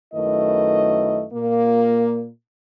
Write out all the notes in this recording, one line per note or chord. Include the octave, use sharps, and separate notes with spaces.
F#2 D#3 A3 E4 B4 D#5
A#2 A#3